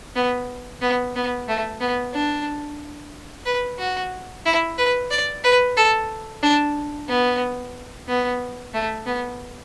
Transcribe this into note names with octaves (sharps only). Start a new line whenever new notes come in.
B3
B3
B3
A3
B3
D4
B4
F#4
E4
B4
D5
B4
A4
D4
B3
B3
A3
B3